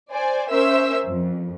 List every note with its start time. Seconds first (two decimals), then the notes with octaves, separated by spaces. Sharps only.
0.12 C5 D5 G#5
0.51 C#4 A#4 C5 E5 E6
1.06 F2